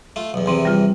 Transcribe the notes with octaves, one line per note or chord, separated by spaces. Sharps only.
A3 F4
B1 E2
E2 C3 E3 F3 C4
G3 F4